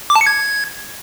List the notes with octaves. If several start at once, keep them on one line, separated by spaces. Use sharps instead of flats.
D6
A5
C#7
G#6